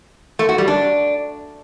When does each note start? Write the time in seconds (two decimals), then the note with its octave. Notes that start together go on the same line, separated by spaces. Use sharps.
0.39 A3
0.49 F#4
0.58 G3
0.68 D4